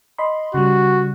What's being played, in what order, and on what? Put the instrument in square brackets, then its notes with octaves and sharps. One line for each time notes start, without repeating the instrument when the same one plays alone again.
[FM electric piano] D#5 B5 C6
[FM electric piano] C#3 G3 [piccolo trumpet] F#4